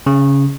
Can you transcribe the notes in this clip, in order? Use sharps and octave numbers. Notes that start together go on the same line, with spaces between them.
C#3